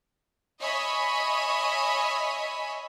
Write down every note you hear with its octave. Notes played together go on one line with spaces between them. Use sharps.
C#5 D#5 E5 G#5 B5